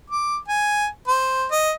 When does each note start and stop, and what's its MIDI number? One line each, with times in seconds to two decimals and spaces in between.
0.10 0.37 86
0.48 0.87 80
1.08 1.46 72
1.52 1.72 75